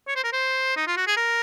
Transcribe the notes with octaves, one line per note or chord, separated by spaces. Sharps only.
C#5
C5
A#4
C5
D#4
F4
F#4
G#4
A#4